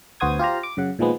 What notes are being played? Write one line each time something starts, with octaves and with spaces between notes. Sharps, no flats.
D2 B3 F#4 C5 D#6 G#6
F4 G4 C5 A#5
D6
F#2 C#3 F#5
A#2 D#3 F3 G#3 B3